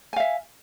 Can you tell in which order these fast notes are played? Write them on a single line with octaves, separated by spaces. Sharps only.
G#5 F5 E5